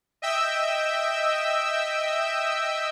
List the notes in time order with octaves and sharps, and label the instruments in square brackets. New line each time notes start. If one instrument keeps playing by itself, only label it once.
[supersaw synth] D#5 E5 G5 E6